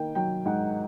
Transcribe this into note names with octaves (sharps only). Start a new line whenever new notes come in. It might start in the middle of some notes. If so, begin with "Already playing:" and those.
Already playing: D#3 A#3 G5
F#3 G5
G#2 F#5